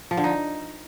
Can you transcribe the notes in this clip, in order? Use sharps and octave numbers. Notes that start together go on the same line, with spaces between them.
F3
D3
D#4